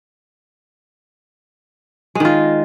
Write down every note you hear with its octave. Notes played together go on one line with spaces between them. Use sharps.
D#3 G#3 F4